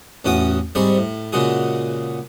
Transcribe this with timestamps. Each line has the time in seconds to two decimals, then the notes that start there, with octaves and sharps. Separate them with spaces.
0.25 A1 E2 C#4 F#4 G5 D#6
0.75 G#2 G3 C4 G#4 B5 C#6
0.98 A2
1.32 A#2 C#3 G#3 F#4 G#4